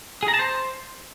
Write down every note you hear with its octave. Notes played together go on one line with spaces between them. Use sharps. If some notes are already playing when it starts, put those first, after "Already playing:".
G#4
A#5
A5
C5